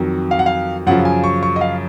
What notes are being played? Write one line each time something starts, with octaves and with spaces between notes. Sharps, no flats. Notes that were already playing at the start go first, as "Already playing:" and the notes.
Already playing: F2 D#3 F#3
F5
F#5
F5
F#2 C#3 F3 F#5
G#5
C#6
C#6
D#5
F5